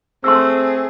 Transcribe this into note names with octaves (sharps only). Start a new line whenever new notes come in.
A3 C4 G#4 C6 E6